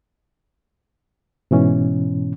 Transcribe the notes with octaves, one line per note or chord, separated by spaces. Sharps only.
G#2 B2 E3 C#4